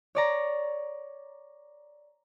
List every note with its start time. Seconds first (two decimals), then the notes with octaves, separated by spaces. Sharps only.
0.15 C#5 D5 A#5